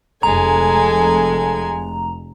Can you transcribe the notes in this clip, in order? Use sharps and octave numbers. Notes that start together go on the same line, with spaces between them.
F1 G#3 A4 G#5 A#5